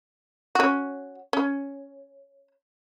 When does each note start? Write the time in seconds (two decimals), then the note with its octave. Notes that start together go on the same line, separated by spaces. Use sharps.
0.55 C#4 F#4
1.33 C#4